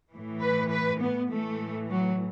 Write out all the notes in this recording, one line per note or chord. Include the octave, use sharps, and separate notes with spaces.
A2 E3
B4
B4
B3
A2 E3 A3
F#3